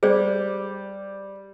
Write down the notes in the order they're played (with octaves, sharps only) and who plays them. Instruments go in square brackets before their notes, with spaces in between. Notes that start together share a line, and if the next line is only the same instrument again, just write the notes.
[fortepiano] G3 [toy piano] G#4 C5 D5